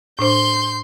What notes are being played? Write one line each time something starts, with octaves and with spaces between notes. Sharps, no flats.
A2 D4 C5 C6 G6